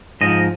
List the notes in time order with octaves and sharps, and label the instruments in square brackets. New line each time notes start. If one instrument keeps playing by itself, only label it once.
[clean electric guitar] G#2 F3 D#5